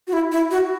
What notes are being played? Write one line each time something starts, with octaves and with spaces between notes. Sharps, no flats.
F#4
E4
E4
F#4